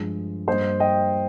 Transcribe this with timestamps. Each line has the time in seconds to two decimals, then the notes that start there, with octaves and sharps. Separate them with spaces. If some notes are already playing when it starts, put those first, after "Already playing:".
Already playing: G2 F3 G#3
0.48 G2 G3 A#3 C5 D#5
0.80 D#5 G5